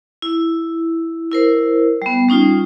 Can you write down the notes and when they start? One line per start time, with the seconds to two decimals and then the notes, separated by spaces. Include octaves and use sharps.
0.22 E4
1.31 E4 A#4 C5
2.02 G3 B3
2.29 G3 C#4 D#4 F4